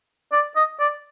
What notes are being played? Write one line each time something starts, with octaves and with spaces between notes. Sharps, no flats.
D5
D#5
D5